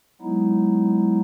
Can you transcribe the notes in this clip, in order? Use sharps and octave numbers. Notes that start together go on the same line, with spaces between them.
F#3 G#3 B3 D#4 E4